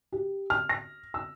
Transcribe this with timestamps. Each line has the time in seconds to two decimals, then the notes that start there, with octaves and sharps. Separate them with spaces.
0.12 G4
0.50 F6
0.69 A#6
1.14 E6